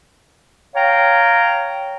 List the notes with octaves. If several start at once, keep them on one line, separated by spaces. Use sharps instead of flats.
C#5 F5 G5 A#5